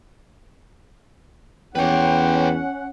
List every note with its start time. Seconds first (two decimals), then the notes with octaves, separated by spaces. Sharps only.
1.75 E2 C#4 B4 C#5 F#5 G5